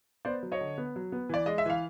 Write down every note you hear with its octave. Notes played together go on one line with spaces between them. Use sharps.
B3 C5 D5
F#3
C#5 D#5
D3
B3
F#3
B3
E3 D5
G#3 D#5
E5
E3 F5